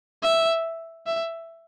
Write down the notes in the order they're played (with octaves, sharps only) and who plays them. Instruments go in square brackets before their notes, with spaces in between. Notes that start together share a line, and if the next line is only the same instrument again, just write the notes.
[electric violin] E5
E5